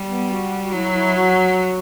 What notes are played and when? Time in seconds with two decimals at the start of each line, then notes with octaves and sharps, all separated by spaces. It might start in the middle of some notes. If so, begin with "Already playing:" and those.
Already playing: G3
0.08 B3
0.30 F#4
0.63 F#4
0.72 F#3 E4
0.94 E4
1.15 F#4